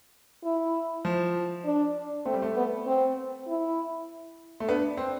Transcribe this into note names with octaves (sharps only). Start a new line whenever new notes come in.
E4
F3
D4
A3 C4
G3
A3
B3
C4
E4
A3
B3 D4
C4